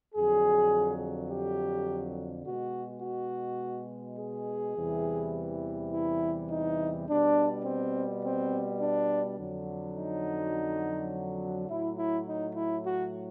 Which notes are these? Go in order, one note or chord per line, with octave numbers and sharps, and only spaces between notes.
F2 D3 F#3 G#4
G4
B2 G#3 F#4
F#4
G#4
E2 C3 E3 G3
E4
D#4
B2 G3 D4
C4
C4
D4
F2 D3 F#3
D#4
A2 F#3 E4
E4
D#4
E4
F#4